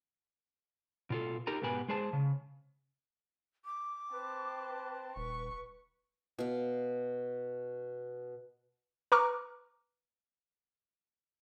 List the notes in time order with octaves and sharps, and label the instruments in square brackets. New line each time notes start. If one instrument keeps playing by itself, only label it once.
[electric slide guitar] B2 F4 A4
D#4 G4 A#4 A#5
G#2 B2 B3 G4 B4 G#5
G#3 G#4 C5 A5
C#3
[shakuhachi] D6
[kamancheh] C4 A5 [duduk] B4
[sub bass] D#1 [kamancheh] B4 C#6
[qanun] B2 F5
[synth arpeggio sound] B4 A#5 C#6 D6 F6 F#6